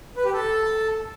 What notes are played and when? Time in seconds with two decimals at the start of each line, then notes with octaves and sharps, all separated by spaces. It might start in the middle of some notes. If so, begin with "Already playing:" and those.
0.16 B4
0.25 G4
0.33 A4